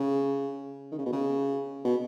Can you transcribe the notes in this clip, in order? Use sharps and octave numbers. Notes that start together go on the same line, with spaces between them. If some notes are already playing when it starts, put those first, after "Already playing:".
Already playing: C#3
D#3
C#3
B2
C#3
B2